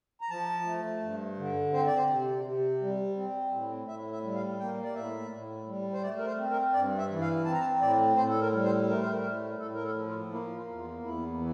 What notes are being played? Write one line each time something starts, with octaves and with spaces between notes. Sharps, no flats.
A#5
F3 A5
A3
G2
D3
C4 C5
D5
C5
C3
C3
G3
C4
A2
A2 E5
E5
G3
F5
A#3 G5
D5
A2 E5
A2
G3
C5
A3 D5
A#4
C5
C4
A#4
G2 D5
E5
E3
F5
C4 A5
A#5
A5
A2 D5
A2 C5
A4
A#4
G3
C5
A3 A#4
C5
A#4
A2
A2 A4
A#4
A4
F3
F4
A#3 E4
F4
E2
F4
E2 E4
E3